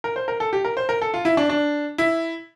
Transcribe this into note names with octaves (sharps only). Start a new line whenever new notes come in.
A#4
C5
A#4
A4
G4
A#4
C5
A#4
A4
F4
E4
D4
D4
E4